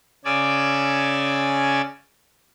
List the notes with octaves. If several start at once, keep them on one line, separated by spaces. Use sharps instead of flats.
C#3 C#4 D5 G#5 D6 E6